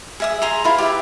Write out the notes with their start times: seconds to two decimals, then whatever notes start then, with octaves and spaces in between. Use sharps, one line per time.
0.20 G#4 E5 D#6
0.42 G#4 A#5 C6
0.64 E4 F4 B4
0.78 G4 B4 E5